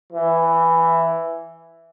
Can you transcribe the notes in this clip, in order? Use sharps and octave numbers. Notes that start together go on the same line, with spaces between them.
E3